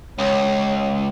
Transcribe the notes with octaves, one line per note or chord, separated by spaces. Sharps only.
C#2 C#5